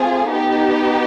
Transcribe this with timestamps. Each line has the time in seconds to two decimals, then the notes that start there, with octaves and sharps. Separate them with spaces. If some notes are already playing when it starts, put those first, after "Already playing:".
Already playing: A3 C4 F4 G#4
0.29 B3 D#4 G4